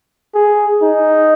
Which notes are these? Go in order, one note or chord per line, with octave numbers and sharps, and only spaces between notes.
G#4
D#4